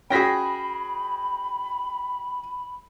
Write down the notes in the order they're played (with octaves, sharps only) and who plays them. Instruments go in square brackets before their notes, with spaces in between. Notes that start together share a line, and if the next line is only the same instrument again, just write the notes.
[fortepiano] C#4 F#4 G#4 [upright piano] G5 A#6 B6 [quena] B5